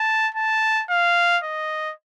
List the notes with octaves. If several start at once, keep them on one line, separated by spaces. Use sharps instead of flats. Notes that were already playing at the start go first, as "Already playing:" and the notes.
Already playing: A5
A5
F5
D#5